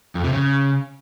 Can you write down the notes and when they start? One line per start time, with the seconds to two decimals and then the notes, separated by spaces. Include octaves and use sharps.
0.15 F2
0.24 C3
0.33 C#3